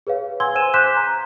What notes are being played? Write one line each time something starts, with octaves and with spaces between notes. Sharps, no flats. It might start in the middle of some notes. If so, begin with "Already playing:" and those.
G#4 B4 C#5 F5
F#5 G#5 C6 E6 G#6 G7
C5 G#5 E6 D#7 E7
C6 D6 F#6 G6 B6 E7
G#5 A#5